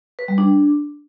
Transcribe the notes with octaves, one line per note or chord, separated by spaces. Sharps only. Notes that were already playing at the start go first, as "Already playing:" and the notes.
B4
G3
D4